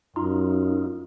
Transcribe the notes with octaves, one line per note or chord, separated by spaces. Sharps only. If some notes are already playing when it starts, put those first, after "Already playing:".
F#2 D#4 F4